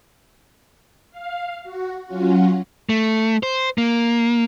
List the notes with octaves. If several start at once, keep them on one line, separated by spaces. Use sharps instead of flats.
F5
F#4
F#3 C#4 F4 F#4
A3
C5
A#3